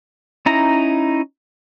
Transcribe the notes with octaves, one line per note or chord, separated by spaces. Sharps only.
C#4 D#4 E4 A#5